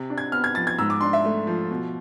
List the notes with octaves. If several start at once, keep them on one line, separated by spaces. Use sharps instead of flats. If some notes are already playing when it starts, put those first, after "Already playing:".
Already playing: C3
D4
G#6
B3 F6
G#6
F3 A6
G#6
G#2 E6
D6
D4 C6
E5
A3
F3
B2